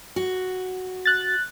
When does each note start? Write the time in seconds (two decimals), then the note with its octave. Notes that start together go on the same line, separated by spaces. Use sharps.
0.16 F#4
1.06 F#6 A6